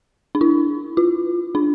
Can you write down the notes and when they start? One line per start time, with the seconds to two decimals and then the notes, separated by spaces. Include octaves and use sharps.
0.35 D4
0.41 E4
0.97 F4
1.55 D4